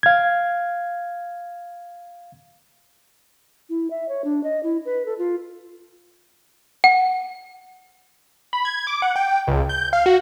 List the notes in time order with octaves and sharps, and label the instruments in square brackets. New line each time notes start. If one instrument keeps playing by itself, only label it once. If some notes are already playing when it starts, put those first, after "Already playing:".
[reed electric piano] F5 G#6
[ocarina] E4
E5
C#5
D4
D#5
E4
B4
A4
F4
[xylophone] F#5
[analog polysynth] B5
G#6
D6
F#5
G5
C#2
G6
F5
F#4